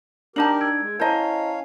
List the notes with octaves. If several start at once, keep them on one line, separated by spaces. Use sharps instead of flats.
D4 D#4 G4 A#4 A5 A#5 G6 F#7
E6 G#6 D7
G#3
C#4 E4 C5 C#5 D#5 F5 A5 A#5